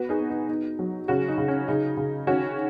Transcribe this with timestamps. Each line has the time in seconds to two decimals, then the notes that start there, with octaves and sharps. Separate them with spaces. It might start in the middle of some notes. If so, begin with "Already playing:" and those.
Already playing: B3 F#4 B4
0.09 D#4 G#4
0.19 B3
0.30 D#4
0.48 B3 D#4
0.79 F#3
1.08 C#3 C#4 F#4
1.29 D#4
1.38 C#3
1.48 C#4
1.68 C#3 D#4
1.97 C#3
2.27 D#3 C#4 F#4